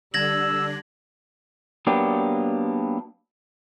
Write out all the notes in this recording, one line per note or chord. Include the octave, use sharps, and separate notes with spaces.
D3 G3 D4 E6 G#6 A#6 F#7
F#3 A#3 B3 D4 G4